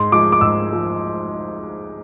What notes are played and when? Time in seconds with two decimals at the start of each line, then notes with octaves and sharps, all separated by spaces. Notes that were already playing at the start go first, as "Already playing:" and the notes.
Already playing: G#2 C6
0.12 F3 G#3 D6
0.32 D6
0.41 G#2 E6
0.70 F3 G#3